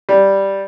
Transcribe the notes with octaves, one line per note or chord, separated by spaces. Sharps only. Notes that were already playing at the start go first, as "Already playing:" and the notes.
G3